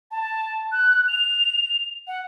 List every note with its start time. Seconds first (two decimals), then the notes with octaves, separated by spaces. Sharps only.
0.11 A5
0.72 F#6
1.08 F7
2.07 F#5